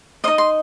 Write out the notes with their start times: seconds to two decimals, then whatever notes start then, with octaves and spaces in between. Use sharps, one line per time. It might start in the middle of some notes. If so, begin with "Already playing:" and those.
0.24 C5 D#5 D#6
0.28 D#4
0.38 C6